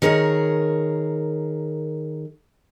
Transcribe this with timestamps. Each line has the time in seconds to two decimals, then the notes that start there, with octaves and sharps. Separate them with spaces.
0.02 D#3 G#4 A#4 C5 C#5